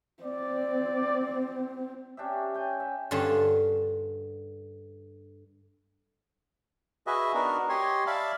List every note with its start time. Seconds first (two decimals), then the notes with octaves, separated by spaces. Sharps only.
0.23 C4 D5
2.17 C#4 D4 G4 E5
2.54 C#5 G5 G#5
2.80 E5
3.11 G2 D3 C#4 F4 A4 A5
7.07 F#4 G#4 B4 D#5 E5
7.34 B3 D4 D#4 F#4 A#4
7.69 G4 C#5 D#5 G#5 C6
8.07 D5 E5 F5 A5 B5